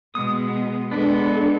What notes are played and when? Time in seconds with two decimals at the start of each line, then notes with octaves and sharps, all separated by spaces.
0.15 B2 G#3 D#6
0.91 G#3 B3 D4 A4